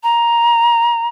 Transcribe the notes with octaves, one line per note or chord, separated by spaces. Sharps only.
A#5